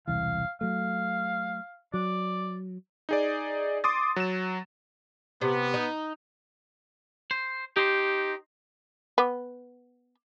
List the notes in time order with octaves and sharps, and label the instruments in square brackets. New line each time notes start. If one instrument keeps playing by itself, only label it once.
[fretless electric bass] E1 C2 E3 [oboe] F5
[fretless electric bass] F#3 A3 [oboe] F5
[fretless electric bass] F#3 [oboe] D5
[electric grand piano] D#4 G#4 D5
C6 D6 D#6 A6
F#3 E7
[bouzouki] C3 [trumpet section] B3
[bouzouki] D#4
[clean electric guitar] C5
[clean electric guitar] D#4 C5 [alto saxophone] G4
[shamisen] B3